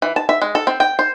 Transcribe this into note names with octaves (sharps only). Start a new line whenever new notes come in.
E3
A5
E5
G#3
A4
C4
G5
C5